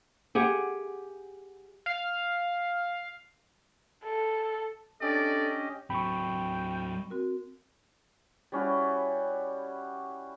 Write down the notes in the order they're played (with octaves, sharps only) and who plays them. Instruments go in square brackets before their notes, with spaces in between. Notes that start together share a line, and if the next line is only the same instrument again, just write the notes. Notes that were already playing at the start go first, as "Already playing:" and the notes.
[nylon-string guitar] G4 G#4 F#5
[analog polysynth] F5
[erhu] A4
[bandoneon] C#4 G4 D#5 [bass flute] D4 [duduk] A4 [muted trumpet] D5
[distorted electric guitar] F#3 C4 [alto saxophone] G5 [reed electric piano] B5 C#6
[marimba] C4 F#4 A#4
[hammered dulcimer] G3 C#4 E4 F#4